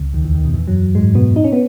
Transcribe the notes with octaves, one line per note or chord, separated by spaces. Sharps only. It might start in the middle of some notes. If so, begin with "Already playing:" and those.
Already playing: C#2 C#3
D#2 D#3
E2 E3
D#2 D#3
B2
E2 E3
F#2 F#3
G#2 G#3
B2 B3
D#4
C#4
B3